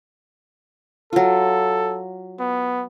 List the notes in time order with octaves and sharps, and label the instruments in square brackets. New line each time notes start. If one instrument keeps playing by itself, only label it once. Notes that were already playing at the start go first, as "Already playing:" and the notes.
[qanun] F#3 F4 [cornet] A4
[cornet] B3